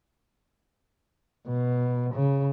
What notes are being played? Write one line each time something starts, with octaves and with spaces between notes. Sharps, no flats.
B2
C#3